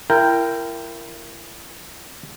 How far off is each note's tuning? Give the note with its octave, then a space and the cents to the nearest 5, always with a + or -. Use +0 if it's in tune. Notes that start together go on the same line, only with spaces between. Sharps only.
E4 +35 A#4 -5 G5 +0